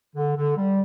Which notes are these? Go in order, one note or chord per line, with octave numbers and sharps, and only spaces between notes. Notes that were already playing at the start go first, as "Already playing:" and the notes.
D3
D3
G3